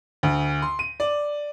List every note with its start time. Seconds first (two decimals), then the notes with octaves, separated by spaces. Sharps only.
0.23 D2
0.62 C6
0.79 D#7
1.00 D5